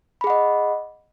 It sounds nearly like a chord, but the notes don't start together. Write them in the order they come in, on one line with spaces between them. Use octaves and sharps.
B5 G#4 F#5 D#5